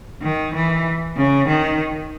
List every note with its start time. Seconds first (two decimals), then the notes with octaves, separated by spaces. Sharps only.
0.22 D#3
0.54 E3
1.17 C#3
1.48 D#3